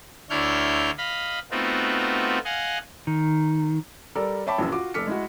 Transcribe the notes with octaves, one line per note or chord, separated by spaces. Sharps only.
D2 D4 E4 C#5 F6 G6
D#5 F5 B5
A3 B3 C4 D#4 F4 F#4
D#5 F5 F#5 G#5
D#3
G3 A4 A#4 D5
C#5 E5 G5 A5 B5 D6
A#1 F#2 E3 E6
F4 F#4 D6
F1 A4 D6 F6 B6 C#7
G#3 E4 F#4